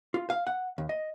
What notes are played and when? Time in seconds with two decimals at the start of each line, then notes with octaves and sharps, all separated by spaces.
0.14 F4
0.30 F5
0.47 F#5
0.78 D#2
0.89 D#5